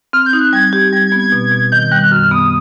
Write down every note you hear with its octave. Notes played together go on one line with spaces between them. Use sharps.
C4 F6
G6
D#4
F#6
G3 G#6
G4
G3 G#6
G#6
B3
G#6
B2
B2
D#3 G6
G3 F#6
F#2 F6
B3 D#6